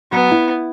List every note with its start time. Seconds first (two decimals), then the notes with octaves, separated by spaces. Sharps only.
0.12 F#3 B3
0.31 E4